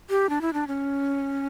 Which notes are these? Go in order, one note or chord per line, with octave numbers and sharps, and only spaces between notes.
G4
D4
E4
D4
C#4